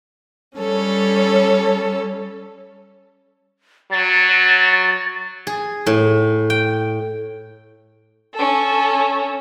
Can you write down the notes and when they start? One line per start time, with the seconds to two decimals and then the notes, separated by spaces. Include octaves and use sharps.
0.58 G3 C#4 A4 C#5
3.92 F#3 A6
5.47 G#4
5.86 A2
6.50 G5
8.34 C#4 A4